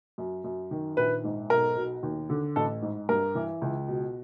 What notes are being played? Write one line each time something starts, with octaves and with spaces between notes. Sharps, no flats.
F#2
F#2
D#3
A#1 B4
G#2
B1 A#4
B2
D#2
D3
A1 A4
G#2
G2 A#4
E3
C#2
B2